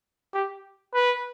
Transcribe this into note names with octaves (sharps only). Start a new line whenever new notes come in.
G4
B4